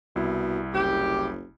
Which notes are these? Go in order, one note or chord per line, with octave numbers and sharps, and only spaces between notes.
C2 B2 E4
F#1 G4